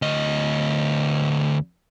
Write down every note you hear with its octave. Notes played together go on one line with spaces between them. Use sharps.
D2 D#5